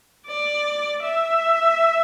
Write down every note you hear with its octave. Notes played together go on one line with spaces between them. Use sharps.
D5
E5